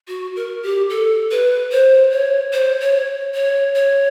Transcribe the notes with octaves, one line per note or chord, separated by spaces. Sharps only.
F#4
A#4
G4
A4
B4
C5
C#5
C5
C#5
C#5
C#5